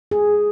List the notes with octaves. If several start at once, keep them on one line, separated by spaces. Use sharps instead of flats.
G#4